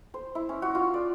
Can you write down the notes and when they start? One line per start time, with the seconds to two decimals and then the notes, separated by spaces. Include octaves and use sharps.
0.14 C5
0.35 E4
0.49 C#4
0.62 F#4
0.75 F4
0.94 D5